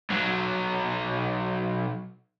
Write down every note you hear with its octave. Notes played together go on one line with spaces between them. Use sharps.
B1 F#3